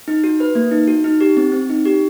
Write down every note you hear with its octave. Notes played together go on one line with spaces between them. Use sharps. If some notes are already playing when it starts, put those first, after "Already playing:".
D#4
F#4
B4
A#3
D#4
F#4
D#4
G4
C4
C4
D#4
G4